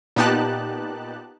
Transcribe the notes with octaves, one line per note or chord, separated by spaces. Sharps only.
A#2 B3 D#4 G4 A5 F#6